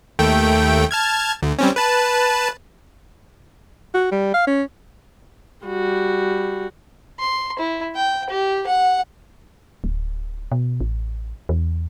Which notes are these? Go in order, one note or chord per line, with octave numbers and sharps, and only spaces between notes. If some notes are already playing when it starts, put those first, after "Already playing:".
D#2 A3 G5
A5 F6 G#6
D2
G3 C4 C#4
B4 A5
F#4
G3
F5
C#4
G3 F#4
C6
E4
G5
G4
F#5
D1
B2
A1
E2